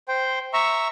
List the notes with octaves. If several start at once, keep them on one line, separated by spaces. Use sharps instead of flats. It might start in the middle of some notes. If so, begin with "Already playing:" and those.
C5 G5
E5 A#5 C#6 E6